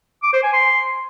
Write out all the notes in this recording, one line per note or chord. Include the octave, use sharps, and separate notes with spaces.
D6
C5
G#5
C6